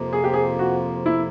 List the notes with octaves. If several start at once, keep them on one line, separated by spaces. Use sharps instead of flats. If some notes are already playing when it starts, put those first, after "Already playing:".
Already playing: F2 C3 F3 A#3
G#4
G4
G#4
F#4
E4